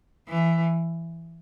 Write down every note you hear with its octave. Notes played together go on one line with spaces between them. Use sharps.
E3